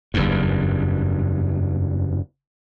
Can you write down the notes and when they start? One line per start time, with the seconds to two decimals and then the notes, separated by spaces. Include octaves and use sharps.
0.14 F#1 E2 G2